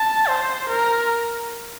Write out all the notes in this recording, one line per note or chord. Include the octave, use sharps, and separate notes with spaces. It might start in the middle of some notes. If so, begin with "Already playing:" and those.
Already playing: A5
C5
A#4